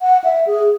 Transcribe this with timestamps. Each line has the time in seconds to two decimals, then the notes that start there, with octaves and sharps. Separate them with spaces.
0.02 F#5
0.24 E5
0.47 G#4